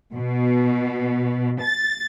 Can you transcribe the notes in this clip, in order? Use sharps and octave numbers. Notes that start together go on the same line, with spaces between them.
B2
A6